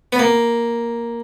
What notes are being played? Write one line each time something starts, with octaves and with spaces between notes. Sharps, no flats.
B3
A#3